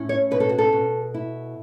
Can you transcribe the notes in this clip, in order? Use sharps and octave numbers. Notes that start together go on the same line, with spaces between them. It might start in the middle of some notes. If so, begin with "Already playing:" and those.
Already playing: A2 C#4
C#5
B2 B4
A4
F#4
A4
B2
E4